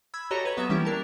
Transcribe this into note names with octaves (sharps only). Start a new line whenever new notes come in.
B5 E6 G#6
F#4 G4 A4 C#5 D#5 A#5
B4 C#5 G#6
F#3 B3 E5 A#6 E7
E3 G3 A#3 C#4 E4 G4
D4 A#4 A5